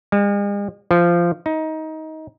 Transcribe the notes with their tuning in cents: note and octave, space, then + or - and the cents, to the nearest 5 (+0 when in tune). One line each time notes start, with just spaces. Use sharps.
G#3 -45
F3 -15
D#4 +20